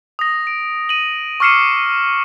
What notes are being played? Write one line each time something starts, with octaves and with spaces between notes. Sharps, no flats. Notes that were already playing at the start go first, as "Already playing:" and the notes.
D#6 A#6
D7
D#7 F#7
C#6 D6 F6 C7 C#7 E7